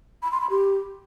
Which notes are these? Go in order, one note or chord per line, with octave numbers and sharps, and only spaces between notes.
B5
C6
B5
G4